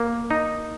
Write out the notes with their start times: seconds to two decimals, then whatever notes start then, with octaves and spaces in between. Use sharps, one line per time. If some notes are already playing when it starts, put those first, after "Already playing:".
Already playing: A#3
0.31 D#4